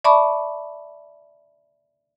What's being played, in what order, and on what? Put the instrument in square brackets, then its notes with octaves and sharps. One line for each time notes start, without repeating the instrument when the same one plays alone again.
[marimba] D5 E5 A5 B5 C#6 D6